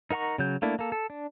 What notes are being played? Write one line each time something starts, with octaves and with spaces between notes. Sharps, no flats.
D#4 A#4 F#5 A#5 C#6
C#3 F#3 G6
A3 A#3 D4 E4
A#3 A4
A4
D4